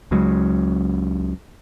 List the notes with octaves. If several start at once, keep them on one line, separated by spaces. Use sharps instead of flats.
C#2 C#3 F#3 G#3